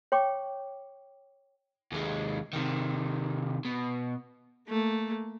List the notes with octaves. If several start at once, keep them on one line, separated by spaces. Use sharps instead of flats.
C#5 G5 C#6 D6
D#2 G#3
C3 D#3
B2
A3 A#3